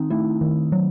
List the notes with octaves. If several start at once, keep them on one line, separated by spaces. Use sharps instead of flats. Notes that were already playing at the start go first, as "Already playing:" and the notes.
Already playing: D#3 C4 D#4
A3 E4
D#3
F#3